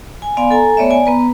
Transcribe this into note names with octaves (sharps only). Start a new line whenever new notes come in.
G#5
B3 D5 F5 G#5 C6
A4 G#5 A#5
A3 B3 C#5 D5 E5
D5 G#5
B3 B4 A#5